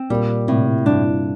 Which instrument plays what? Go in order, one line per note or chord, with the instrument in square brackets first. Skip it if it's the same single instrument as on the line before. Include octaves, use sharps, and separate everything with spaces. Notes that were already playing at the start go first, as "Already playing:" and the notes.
Already playing: [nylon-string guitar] C4
[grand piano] A#2 [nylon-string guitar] G3
[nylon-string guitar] A2 [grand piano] C3
[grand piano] G2 [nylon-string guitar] D4